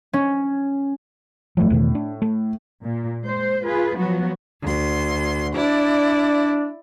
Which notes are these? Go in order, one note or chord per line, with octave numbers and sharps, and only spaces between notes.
C#4
G1 A2 F3 F#3
E2 B2 D#3
D4
A3
A#2
G#3 C5
F4 G#4 B4
F3 F#3 B3 F#4
D2 C6
D4 E4 D5